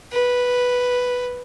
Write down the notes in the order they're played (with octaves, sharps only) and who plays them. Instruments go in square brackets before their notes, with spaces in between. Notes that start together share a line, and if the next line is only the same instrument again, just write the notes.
[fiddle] B4